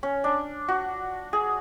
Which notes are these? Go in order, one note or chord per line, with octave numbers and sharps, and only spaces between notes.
C#4
D4
F#4
G#4